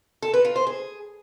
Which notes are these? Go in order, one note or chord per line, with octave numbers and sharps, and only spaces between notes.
A4
B4
F4
C5
G#4